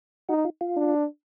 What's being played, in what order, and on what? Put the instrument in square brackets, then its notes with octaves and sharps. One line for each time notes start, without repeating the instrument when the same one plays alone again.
[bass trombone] D#4 [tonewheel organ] F#4
[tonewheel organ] F4
F4
[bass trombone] D4